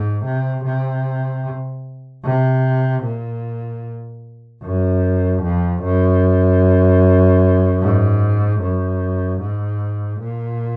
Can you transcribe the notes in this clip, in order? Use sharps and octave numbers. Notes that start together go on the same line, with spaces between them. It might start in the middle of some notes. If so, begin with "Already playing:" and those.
Already playing: G#2
C3
C3
C3
A#2
F#2
F2
F#2
G#2
F#2
G#2
A#2